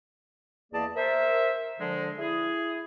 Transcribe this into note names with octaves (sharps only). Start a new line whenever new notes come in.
E2 A#3 G#4 D5 D#5 A5
A#4 C5 E5
D3 F3 G#3
E4 G#4